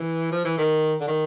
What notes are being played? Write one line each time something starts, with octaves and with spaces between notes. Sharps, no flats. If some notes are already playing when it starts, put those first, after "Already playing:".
Already playing: E3
F3
E3
D#3
D3
D#3